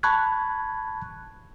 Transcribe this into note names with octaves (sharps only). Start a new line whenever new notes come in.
A5 B5 C#6 F#6 G#6